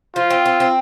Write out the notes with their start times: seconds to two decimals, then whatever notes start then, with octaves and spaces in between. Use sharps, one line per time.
0.16 F3 F4
0.30 C4
0.46 C4
0.60 C4